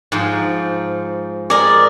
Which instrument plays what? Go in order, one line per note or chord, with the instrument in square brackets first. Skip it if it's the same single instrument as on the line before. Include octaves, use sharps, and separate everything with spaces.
[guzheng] G#2 F3
[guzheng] G#4 A#4 D#5 [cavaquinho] D5